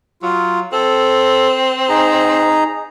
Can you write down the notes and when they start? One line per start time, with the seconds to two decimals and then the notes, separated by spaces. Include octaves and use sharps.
0.22 F#3 F4
0.73 C4 A4
1.89 D#4 G#4 A#5